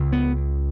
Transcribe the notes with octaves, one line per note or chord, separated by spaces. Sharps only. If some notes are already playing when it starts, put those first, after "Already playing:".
Already playing: C#2 C#3
B3